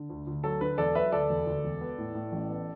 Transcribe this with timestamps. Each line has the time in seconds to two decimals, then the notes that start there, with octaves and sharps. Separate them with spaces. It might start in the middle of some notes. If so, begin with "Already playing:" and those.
Already playing: D3
0.10 D2
0.27 D2
0.44 F#3 A4
0.61 D3 B4
0.78 E1 A4 D5
0.95 F#3 B4 E5
1.12 D2 A4 D5
1.30 E1
1.46 D2
1.64 E1
1.81 B3
1.98 A2
2.15 A2
2.32 A1
2.50 B3